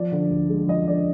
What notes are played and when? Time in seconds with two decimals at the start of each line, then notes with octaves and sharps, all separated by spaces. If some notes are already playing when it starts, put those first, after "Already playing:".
Already playing: F3 D5
0.12 D3
0.30 D2
0.49 G#3
0.68 F3 D#5
0.88 D3 D5